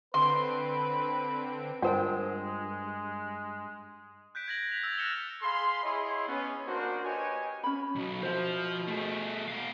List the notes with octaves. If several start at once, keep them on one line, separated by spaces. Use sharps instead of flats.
D3 C4 B4 C6 D7
G2 G#3 F4 A#4 C5 F#5 G5
F#6 G6 B6 D7
G#6 A#6 F#7
B6 F7
E6 A6
F6 F#6 A#6 C#7 E7 G7
G#4 F5 B5 C6
E4 G#4 C#5 D#5 B5 C6
B3 C#4
A#3 D4 F#4 A#4 C5
G4 B4 C#5 D#5 G5 G#5
C#4 B5
B1 B2
B2 F3 C5 E5
A3 G#4
B3 F5